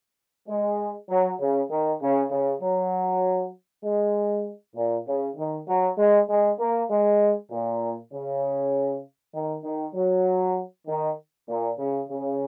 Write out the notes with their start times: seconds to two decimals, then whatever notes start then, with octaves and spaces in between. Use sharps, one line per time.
0.49 G#3
1.10 F#3
1.40 C#3
1.71 D#3
2.01 C#3
2.31 C#3
2.62 F#3
3.84 G#3
4.75 A#2
5.07 C#3
5.37 D#3
5.68 F#3
5.98 G#3
6.29 G#3
6.59 A#3
6.89 G#3
7.51 A#2
8.13 C#3
9.34 D#3
9.64 D#3
9.95 F#3
10.87 D#3
11.49 A#2
11.79 C#3
12.09 C#3